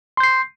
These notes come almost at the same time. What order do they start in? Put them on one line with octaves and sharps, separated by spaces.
C6 G6 C7